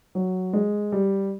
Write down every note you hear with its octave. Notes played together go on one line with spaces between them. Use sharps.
F#3
G#3
G3